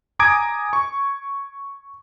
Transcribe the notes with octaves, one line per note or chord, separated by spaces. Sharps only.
G#5 A#5 D6 D#6 G#6 D7
C#6